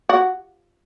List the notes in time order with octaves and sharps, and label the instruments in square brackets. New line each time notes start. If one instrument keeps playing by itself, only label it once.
[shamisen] F#4